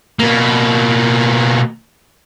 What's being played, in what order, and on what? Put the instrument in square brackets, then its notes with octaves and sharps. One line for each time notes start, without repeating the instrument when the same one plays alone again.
[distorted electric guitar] B2 A#3